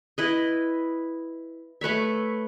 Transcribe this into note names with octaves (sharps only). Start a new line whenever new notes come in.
E4 B4 D#5
A3 B4 C#5 E5